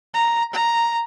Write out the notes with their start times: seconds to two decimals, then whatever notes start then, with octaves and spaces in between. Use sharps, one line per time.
0.14 A#5
0.54 A#5